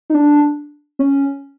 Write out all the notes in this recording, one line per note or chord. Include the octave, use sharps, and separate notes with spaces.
D#4
D4
C#4